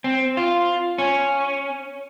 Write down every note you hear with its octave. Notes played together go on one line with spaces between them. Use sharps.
C4
F4
C#4